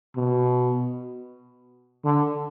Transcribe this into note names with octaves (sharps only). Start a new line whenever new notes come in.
B2
D3